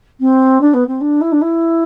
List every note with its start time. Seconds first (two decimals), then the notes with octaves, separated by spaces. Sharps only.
0.20 C4
0.60 D4
0.73 B3
0.87 C4
1.00 D4
1.21 E4
1.31 D4
1.41 E4